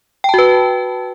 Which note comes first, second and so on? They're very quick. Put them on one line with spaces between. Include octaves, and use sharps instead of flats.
G5 A5 F#4 B4